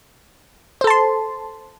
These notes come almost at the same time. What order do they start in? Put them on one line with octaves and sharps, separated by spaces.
C5 A4 A5 C6